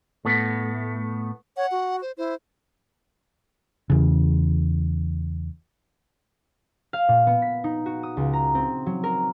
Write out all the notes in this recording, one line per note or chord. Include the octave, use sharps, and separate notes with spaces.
A2 A3 B3
C#5 F#5
F#4
C5
E4 C5
E2 C#3
F5
A#2
B3
B6
D#4
F#4
D#6
C#2
A#5
C4
F#3
A#4